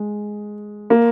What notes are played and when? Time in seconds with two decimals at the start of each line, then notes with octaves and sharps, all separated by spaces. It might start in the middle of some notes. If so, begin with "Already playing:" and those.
Already playing: G#3
0.90 A#3